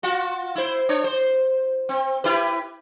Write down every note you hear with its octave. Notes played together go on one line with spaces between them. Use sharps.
F4 F#4
E4 C5
D4 C#5
C5
C4
E4 G4 B4